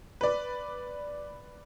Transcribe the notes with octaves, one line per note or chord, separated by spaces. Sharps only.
B4 D5